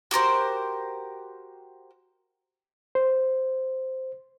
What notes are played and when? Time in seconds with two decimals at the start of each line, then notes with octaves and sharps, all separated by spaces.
0.11 F#4 G4 A#4 C5
2.95 C5